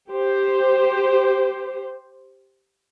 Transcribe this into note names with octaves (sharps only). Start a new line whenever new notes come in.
G4 C5